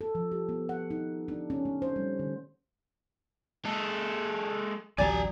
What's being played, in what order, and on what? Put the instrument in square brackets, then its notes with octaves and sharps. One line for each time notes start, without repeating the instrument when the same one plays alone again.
[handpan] A4
F3
G4
B3
F#5
D#4
D4
C#4
A3
C5
G3
D3
[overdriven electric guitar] G#3 A4
[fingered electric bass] A1 D2 F#3 [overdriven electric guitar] G4 G#5 [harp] D5 A#5